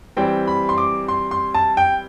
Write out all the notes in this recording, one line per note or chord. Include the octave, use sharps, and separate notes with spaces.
E3 G3 C4 G5
B5
C6
D6
C6
C6
A5
G5